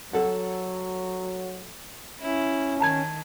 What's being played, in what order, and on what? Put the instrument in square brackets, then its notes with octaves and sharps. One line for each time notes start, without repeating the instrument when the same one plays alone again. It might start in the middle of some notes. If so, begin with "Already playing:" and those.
[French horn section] F#3 [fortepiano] A4 F#5
[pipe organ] C#4 [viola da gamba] E4
[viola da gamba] D#3 [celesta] A5 A#5 G#6